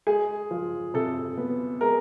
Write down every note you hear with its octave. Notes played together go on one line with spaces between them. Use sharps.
G#3 G#4
F3
C3 A4
B3
G#3 A#4